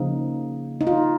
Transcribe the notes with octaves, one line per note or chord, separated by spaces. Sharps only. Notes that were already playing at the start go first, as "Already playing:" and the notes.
Already playing: C#3 F3 A#3 D#4
D#4
F4